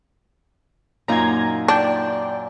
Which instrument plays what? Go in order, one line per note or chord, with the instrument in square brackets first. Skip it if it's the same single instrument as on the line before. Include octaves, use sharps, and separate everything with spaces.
[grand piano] F#2 A#2 [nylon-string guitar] A#3 D#4 F4 [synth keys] A#5 G#6
[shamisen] D4 [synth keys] D5 G5